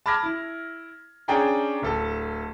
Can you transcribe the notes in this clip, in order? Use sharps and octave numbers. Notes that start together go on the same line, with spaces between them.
A5 B5 D6 F6 G#6 A#6
E4
C#4 D4 G#4 G5 G#5 A#5
D1 A4 A5